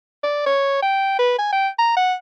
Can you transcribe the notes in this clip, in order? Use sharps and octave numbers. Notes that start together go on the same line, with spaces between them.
D5
C#5
G5
B4
G#5
G5
A#5
F#5